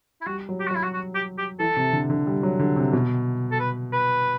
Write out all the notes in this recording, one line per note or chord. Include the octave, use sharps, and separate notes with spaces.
E4
G3 F#4
F#3
G4
F#4
F#3 E4
F#4
F#4
G4
G4
E3 A4
C3
D3
D3
G3
F#3
D3
C3
B2
A4
B4
B4